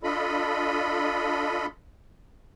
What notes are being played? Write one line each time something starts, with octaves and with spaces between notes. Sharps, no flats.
D4 F4 A4 D#5 B5